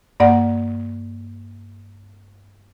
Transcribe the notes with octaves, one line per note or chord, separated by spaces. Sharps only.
G2 A#3 D5 F#5